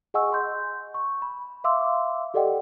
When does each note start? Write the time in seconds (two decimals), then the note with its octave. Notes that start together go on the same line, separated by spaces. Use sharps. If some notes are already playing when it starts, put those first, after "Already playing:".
0.14 G#4 D#5 F#5 G#5 C#6 E6
0.32 C6 G6
0.94 C#6
1.22 B5
1.64 E5 F5 C6 D6 E6
2.34 G4 A4 D5 D#5 F#5 G5